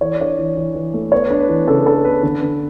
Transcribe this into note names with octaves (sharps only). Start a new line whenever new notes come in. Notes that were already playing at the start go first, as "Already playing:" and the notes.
E3 C#5
D5
D4 C#5
E3
E3
E3
A3
B3 C#5
D4
B4
E3
C#3 A4
D4 A4
B3 B4
D3 B4
D3